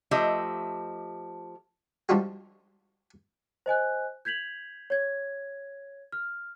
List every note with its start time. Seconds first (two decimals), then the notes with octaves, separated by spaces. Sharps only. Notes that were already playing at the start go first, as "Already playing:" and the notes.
0.11 F3 A3 G4 D#5 E5
2.09 F3 G3 D4 D#4 F4 F#4
3.66 C5 D#5 G#5 F#6
4.25 G6 G#6 B6 F7 F#7
4.90 C#5 G#6
6.12 F6